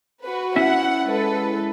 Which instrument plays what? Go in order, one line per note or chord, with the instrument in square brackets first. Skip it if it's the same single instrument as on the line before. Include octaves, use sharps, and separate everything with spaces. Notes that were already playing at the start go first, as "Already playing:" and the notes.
[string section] F#4 B4
[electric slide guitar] C#4 E4 E5 [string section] F#5
[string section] G#3 A4 B4